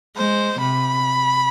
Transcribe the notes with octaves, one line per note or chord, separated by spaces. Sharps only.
G#3 C5
C3 B5